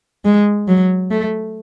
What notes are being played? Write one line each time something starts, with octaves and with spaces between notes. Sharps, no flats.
G#3
F#3
A3